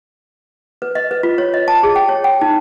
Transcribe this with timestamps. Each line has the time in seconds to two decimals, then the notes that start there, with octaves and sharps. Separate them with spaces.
0.82 B4
0.95 D#5
1.11 B4
1.23 F4
1.38 C#5
1.54 D#5
1.68 A5
1.83 G#4
1.96 G5
2.09 C#5
2.24 G5
2.41 D#4